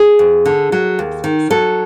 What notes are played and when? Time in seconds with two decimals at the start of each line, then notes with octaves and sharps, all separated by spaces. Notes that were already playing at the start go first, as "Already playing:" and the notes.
Already playing: G#4
0.19 F2
0.46 D3
0.72 F#3
0.99 D#2
1.24 D#3
1.50 F#3 A4